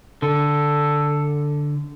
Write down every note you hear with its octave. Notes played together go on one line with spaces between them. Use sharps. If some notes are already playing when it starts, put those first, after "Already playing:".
D3 A4